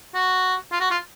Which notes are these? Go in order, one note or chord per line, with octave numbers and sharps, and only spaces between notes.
F#4
F4
F#4
F4